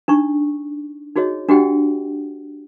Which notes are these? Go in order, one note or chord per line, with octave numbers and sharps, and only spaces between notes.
D4 D#4 C#6
D#4 F#4 G#4 C#5 D#5
D4 F#4 G4 D#5 F#5 G5